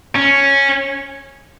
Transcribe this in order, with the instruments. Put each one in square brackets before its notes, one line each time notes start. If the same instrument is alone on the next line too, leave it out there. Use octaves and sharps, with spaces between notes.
[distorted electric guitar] C#4